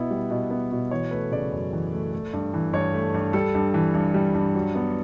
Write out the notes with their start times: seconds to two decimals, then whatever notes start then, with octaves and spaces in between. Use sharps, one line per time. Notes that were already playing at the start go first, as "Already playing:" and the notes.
Already playing: B2 B3 E4
0.11 G3
0.31 B2
0.51 B3
0.71 B2
0.91 E3 C#5
1.11 A3 B4
1.32 C#3 D5
1.52 F#2
1.73 E3
1.93 A3
2.13 A3
2.33 G2
2.54 E3
2.73 G2 C#5
2.94 A3
3.14 G2
3.33 G3 A4
3.55 G2
3.74 E3
3.94 G2
4.14 G3
4.34 G2
4.55 F#3
4.75 B3